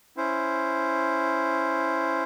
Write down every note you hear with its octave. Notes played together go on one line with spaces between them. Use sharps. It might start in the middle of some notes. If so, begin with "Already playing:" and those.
C#4 E4 C5